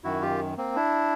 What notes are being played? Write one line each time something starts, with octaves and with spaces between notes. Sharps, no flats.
F#2 D#3 E4 F#4
F4 G4
A#3 C4
D4 E4